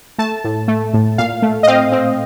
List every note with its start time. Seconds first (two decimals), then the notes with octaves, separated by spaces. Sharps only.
0.18 A3 A5
0.44 A2
0.68 A3
0.94 A2
1.18 A#2 F5
1.42 A3
1.63 D#5
1.67 C4 F5
1.92 C4